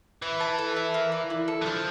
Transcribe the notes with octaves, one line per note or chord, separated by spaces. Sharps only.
E3 E4
A5
A4
E5
A#3
D5
E4
A4
E3
F3 D4